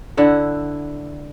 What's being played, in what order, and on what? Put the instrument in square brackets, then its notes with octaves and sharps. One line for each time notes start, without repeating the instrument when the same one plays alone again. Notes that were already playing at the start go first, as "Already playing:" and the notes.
[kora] D3 E4 F#5